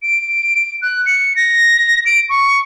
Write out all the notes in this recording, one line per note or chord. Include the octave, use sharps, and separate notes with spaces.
D7
F#6
C#7
A#6
D7
C#6